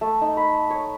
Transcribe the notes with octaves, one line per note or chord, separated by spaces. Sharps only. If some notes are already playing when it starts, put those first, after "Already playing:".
A3
D#4
B5
C#5